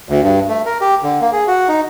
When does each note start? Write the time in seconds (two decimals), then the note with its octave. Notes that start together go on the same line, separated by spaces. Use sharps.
0.09 D2
0.24 G2
0.48 A3
0.66 A#4
0.81 G4
1.03 D3
1.21 A#3
1.32 G#4
1.48 F#4
1.69 D#4